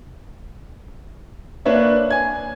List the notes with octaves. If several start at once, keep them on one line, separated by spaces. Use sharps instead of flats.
A#3 D4 B4 C#5 E5
G#5 G#6